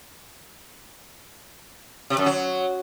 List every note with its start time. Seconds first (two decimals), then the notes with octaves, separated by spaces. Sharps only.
2.10 C3
2.18 F#2
2.26 F#3